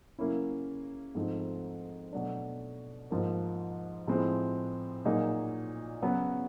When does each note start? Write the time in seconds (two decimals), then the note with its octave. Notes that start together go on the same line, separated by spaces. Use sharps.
0.19 C#3 F#3 A#3 C#4 E4
1.15 G#2 F3 A3 C4 D#4
2.13 B2 F#3 A3 D4
3.10 G#2 F3 A#3
4.07 A2 F3 G#3 C4
5.05 A#2 F#3 A#3 D#4 G#4
6.02 C#3 F#3 B3